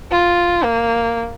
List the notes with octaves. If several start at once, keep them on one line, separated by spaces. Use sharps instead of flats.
F4
A#3